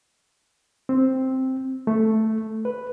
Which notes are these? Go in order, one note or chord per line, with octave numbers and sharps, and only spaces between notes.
C4
A3
B4